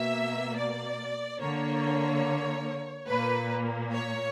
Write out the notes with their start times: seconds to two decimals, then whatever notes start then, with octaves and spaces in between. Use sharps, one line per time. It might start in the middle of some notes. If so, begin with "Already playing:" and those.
Already playing: B2 A#3 E5
0.56 D5
1.39 D3 A#3 C#5
3.07 A#2 A#3 B4
3.92 C#5